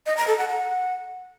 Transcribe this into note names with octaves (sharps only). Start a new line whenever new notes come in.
D#5
A#5
A4
F#5
F#5